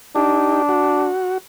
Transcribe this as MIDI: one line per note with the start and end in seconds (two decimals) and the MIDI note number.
0.16 1.08 62
0.16 0.62 63
0.16 0.62 67
0.69 1.38 66